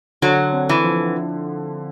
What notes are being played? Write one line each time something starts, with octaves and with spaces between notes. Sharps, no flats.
D3 F#3
C4
E3
F3